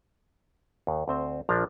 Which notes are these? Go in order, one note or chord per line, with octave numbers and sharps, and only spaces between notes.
D#2
D2 C4 C5
A#1 F3 D4 A#5